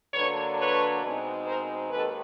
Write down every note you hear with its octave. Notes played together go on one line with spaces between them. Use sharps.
D3 F#3 A#3 D4 B4 C#5
B4 C#5
B2 G#3 C4 D#4
A#4 C5
D#2 D#3 G#3 A4 B4